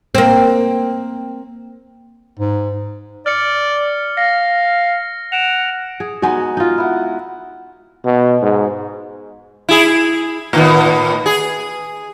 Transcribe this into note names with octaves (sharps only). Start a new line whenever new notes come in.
A#3 C4
G#2
D5 F6 C#7
F5 A#6
F#5 D7 E7 F7
G#4
G#3 B3 D#4 F#4 G#5
D#4 F4
E4 F#5
B2
G#2
E4 G#4
A2 D#3 B3
G#4